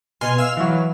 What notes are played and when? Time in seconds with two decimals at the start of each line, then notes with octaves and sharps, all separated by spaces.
0.21 B2 B3 G#5 C6 F6
0.38 F5 E6 F6
0.57 E3 F#3